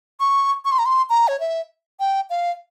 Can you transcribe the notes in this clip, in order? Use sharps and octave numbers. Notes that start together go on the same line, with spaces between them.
C#6
C#6
C6
A#5
C6
A#5
C#5
E5
G5
F5